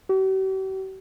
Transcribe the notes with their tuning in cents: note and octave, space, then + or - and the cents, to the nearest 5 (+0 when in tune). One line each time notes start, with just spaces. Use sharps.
G4 -45